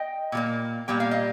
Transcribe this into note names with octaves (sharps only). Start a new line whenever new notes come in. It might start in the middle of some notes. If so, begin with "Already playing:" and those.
Already playing: D#5 G5
A#2 G3 A#3
A#2 G3 A#3 G5
F5
D#5